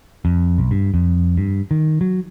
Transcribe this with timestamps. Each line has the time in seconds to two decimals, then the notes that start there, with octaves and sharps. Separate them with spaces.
0.25 F2
0.58 B1
0.71 G2
0.94 F2
1.38 G2
1.71 D#3
2.01 F#3